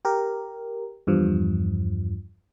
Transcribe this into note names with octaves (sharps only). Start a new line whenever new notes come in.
G4 A#4
E2 G2 F3